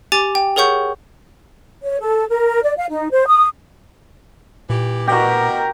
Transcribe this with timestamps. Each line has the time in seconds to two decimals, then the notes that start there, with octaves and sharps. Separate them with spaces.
0.12 G4 G#5 D6 A6
0.35 G5
0.56 G#4 A#4 C#5 F#5 C#6 G6
1.82 C#5
2.01 A4
2.28 A#4
2.63 D5
2.77 F5
2.90 D#4
3.11 C5
3.26 D#6
4.70 A#2 E3 G4
5.08 B2 F#4 G4 A#4